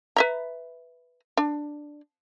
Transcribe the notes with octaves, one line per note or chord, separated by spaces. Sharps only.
B4 E5 A#5
D4